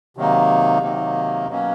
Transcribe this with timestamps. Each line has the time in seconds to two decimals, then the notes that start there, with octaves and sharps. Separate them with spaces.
0.16 C3 D#3 F#3 A#3 D#4
0.82 C3 D#3 F#3 A#3 D#4
1.48 B2 F#3 A#3 C#4